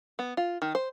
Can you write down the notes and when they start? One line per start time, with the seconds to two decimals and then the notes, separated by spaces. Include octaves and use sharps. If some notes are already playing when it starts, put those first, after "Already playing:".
0.19 B3
0.37 F4
0.62 D#3
0.75 C5